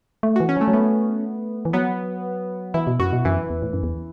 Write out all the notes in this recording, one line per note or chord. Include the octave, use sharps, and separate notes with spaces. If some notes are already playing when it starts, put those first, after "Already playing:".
A3
E3 F#4
C#4
F#3
A3
F#3
A3 B3
E3
F#3 B3
E3 E4
B2
F#2 F#4
B2
F#2 E3
E2
A2
F#2
E2